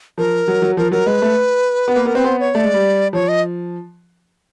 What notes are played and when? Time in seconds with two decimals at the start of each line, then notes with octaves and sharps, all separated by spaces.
0.18 F3 A#4
0.48 F#3
0.62 F#3
0.77 F3 A#4
0.91 F#3 A#4
1.06 G#3 B4
1.22 A3
1.88 B3
1.96 A#3
2.06 B3 A#4
2.15 C4 B4
2.24 B3 C5
2.40 C#5
2.55 A3 D5
2.64 G#3
2.74 G3
3.13 F3 C#5
3.28 D#5